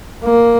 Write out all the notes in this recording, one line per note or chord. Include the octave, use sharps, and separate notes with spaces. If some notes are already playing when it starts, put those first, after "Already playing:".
A#3